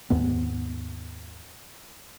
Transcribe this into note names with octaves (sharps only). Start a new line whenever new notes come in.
D#2 G#2 B3